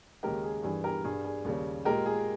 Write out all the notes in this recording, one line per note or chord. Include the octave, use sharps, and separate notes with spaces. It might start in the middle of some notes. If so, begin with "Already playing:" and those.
D#2 C#3 G#3 G4 A#4
G#4
G2 E3 G3 G#4
G4 A#4
G2 G3 G#4
G#4
D#2 C#3 G3
A#2 G#3 G4 A#4
G#4